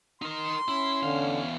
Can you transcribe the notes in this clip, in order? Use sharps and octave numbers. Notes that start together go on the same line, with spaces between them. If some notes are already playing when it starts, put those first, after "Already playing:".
D#4 A#4 C6
C#4 E4
E2 D3 F5